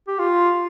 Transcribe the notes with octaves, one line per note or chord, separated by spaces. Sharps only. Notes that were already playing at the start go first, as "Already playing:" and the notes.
G4
F4